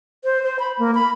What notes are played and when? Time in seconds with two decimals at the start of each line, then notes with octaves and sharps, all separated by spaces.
0.24 C5
0.43 C5
0.59 B5
0.79 A#3
0.95 B5